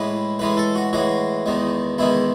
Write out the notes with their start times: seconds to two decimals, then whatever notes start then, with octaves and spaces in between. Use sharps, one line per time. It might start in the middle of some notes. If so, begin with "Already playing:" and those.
Already playing: A2 E3 G#3 B4
0.39 A2 E3 G#3 B4
0.57 A4
0.75 F#4
0.93 A2 E3 G#3 F#4
1.46 E2 D#3 G#3
1.98 E2 D#3 G#3 E4